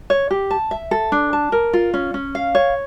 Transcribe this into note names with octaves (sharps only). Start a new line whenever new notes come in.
C#5
G4
A5
E5
A4
D4
A5
A#4
F4
C#4
C#4
F5
C#5